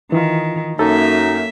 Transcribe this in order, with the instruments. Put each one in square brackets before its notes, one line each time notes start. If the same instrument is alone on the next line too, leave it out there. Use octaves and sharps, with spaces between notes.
[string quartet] D#3 [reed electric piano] E3 F4
[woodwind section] F#2 D#4 [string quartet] A#3 E5 [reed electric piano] A4